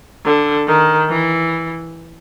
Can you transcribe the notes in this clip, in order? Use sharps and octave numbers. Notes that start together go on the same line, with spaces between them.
D3
D#3
E3